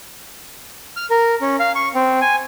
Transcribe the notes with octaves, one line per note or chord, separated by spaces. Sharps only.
F6
A#4
C#4
F5
C#6
C4
G#5